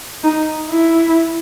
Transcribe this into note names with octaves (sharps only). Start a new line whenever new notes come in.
D#4
E4